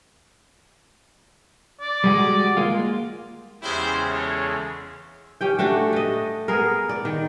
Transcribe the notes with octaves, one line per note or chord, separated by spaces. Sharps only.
D5
G3 G#3 F#4
G#3 A#3 F4
E2 C#3 G#3 E4 G4 C5
A4 C#5
C#4 G4 G5
A3 D4 F#4 G4
A3 D#5
B3 G#4 A#4
D5
D#3